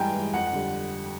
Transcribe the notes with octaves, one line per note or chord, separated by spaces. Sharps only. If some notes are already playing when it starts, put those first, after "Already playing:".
Already playing: G2 E3 G#3 G5 G#5 A#5
E3 G#3
F2 F#5
F#5
D3 G3